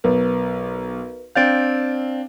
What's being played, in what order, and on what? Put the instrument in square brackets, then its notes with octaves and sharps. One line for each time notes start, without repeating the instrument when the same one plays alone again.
[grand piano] B1 [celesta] A#4 B4
[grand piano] C4 D4 F5 [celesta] G6 A6 D7